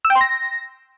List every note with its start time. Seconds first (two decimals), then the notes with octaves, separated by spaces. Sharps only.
0.05 E6
0.10 G5
0.15 C6
0.21 A#6